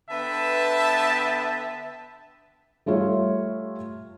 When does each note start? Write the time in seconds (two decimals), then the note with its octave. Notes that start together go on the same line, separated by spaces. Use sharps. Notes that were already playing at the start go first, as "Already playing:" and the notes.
0.10 D3 B3 B4 E5 G5 A5
2.86 G3 A3 F4 C#5